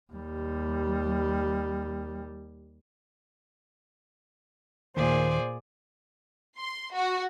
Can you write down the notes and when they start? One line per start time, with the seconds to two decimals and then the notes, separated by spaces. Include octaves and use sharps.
0.13 D#2 G3
4.97 D#2 A#2 G#4 C5 D5
6.57 C6
6.93 F#4